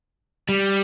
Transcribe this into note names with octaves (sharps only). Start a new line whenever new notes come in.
G3